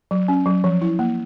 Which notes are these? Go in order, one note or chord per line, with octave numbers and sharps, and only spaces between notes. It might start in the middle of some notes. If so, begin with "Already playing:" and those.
F#3
C#4
F#3
F3
E4
A#3